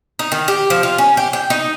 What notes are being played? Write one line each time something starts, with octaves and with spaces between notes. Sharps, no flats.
D#4
D#3
G4
F3
F4
C#4
G4
G5
D#4